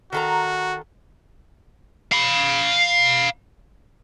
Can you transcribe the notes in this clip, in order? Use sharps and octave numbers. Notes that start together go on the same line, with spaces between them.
D#3 F#4 A4 A#5
F5 B5